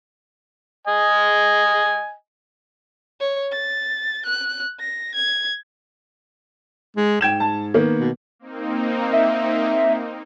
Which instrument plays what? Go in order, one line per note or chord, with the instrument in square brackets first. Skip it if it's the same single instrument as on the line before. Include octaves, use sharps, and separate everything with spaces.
[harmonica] D#5 G#5
[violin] C#5
A6
F#6
A#6
G#6
[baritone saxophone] G#3
[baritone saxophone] G#2 [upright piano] G5 G#6 E7
[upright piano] A5
D#3 A#3 B3
[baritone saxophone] B2
[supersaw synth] A#3 C4 D#4
[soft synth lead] E5